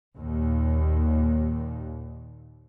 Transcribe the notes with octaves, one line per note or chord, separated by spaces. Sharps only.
D#2 A#2